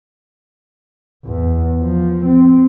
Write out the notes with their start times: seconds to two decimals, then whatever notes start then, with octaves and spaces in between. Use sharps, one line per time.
1.25 E2
1.81 F3
2.25 C4